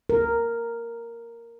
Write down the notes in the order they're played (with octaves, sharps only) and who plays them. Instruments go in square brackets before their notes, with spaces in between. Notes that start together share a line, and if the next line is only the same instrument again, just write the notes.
[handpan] A#4